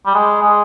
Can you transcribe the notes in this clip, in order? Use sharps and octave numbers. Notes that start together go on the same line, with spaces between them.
G3
G#3
G#3